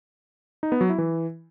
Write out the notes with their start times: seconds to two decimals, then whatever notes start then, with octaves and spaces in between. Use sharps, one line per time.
0.63 D#4
0.72 B3
0.81 F#3
0.90 E4
0.98 E3